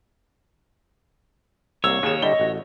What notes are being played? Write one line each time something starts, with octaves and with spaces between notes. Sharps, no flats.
C2 A#3 C#5 E6
D#2 G#4 D#5 E7
D3 G3 E4 D#5 G7
A1 F#4